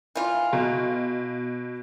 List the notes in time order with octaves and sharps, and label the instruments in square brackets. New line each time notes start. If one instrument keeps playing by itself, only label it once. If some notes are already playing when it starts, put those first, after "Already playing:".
[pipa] E3 F4
[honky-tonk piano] B2